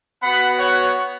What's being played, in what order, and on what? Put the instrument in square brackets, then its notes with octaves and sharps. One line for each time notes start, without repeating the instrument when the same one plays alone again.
[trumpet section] B3 F#4 F#5 B5
C#5 F#5